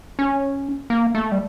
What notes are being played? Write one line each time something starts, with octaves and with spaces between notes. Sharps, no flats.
C#4
A#3
A3
G3